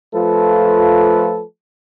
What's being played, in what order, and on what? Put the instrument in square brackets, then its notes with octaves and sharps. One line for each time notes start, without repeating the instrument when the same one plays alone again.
[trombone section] F3 A3 F4 A4 B4